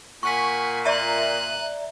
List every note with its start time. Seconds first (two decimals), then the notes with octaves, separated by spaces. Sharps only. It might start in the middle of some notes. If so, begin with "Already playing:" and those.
0.23 A#2 F#5 G#5 C#6 B6
0.85 D5 E5 A#5 F#6 D#7